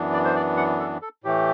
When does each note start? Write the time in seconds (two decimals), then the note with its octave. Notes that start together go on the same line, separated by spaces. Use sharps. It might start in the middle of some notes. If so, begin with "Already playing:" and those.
Already playing: F#2 E3 B3 D4
0.13 D5
0.25 C5
0.35 D5
0.57 F#5
0.80 A4
1.02 A4
1.24 A2 E3 A3 G4